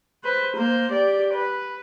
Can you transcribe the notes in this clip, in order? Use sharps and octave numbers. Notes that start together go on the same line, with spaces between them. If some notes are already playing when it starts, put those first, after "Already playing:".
B4 C5
A#3 C5
G4 D5
B4